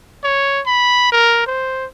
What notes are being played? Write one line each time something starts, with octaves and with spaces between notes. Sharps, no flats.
C#5
B5
A#4
C5